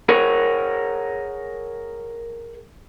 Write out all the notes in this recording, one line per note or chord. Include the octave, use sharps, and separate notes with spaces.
G#4 A#4 C#5 F#5